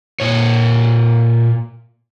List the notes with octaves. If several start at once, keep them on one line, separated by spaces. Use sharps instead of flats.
A#2 C#5